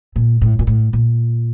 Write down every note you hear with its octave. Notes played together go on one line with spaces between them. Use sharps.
A#2
A2
A#2
A2
A#2